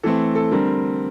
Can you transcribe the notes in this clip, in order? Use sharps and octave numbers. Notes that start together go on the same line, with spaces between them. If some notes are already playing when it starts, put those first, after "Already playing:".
E3 A3 C4 A4
A4
D3 G3 C4 A#4